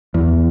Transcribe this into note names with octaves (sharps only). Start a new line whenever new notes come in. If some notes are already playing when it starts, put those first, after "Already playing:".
E2